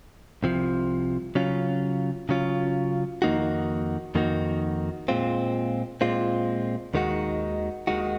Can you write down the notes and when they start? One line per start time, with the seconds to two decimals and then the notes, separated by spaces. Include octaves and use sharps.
0.43 C2 C3 F3
1.35 C#3 F#3 C#4 F4
2.29 C#3 F#3 C#4 F4
3.22 F2 D#3 A#3 D#4 F#4
4.15 F2 D#3 A#3 D#4 F#4
5.08 A#2 G#3 C4 F4
6.01 A#2 G#3 C4 F4
6.94 D#2 D#3 G#3 D#4 F#4
7.87 D#2 D#3 G#3 D#4 F#4